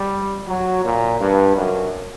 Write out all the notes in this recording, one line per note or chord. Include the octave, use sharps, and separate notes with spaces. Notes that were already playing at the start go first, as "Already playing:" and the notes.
Already playing: G3
F#3
A#2
G2
F#2